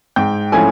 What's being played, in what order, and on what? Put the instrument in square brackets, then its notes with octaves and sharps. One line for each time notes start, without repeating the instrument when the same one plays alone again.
[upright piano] G#2 [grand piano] G5
[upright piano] F3 A3 C#4 E4 [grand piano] G#5